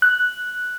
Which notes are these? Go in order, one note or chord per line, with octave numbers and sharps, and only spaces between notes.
F#6